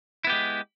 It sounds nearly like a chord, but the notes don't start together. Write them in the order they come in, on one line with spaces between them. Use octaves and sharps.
E4 B3 G4 G#3